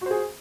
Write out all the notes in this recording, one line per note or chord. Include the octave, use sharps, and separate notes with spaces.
F#4 G#4 C5